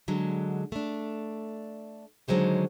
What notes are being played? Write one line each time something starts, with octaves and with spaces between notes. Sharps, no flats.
D3 F#3 G#3
A3 D4
D3 D#3 F#3 G#3 C5 C#5